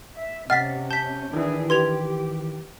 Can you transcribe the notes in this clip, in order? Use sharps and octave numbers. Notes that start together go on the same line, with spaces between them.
E5
C3 C#4 D#5 F#5 F6 A6 B6
A5 G6 B6
D#3 E3 D4 E4 G#4
G4 B4 C6 G#6 F7